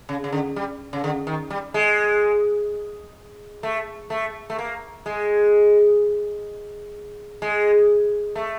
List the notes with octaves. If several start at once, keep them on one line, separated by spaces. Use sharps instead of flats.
C#3
C#3
D3
G3
C#3
D3
D#3
G3
G#3
A3
A3
A3
A#3
G#3
G#3
A3